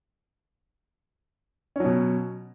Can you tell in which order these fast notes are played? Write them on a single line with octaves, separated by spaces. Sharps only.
C#4 F#3 B2